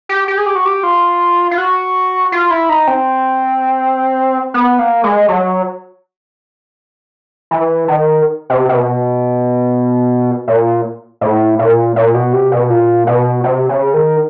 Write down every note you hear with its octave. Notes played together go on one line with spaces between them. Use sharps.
G4
G4
G#4
G4
F#4
G4
F4
F4
F#4
F4
E4
D#4
C4
B3
A#3
G#3
F#3
E3
D#3
C3
C3
B2
A#2
A2
A#2
A#2
B2
C3
B2
A#2
B2
C3
C#3
D#3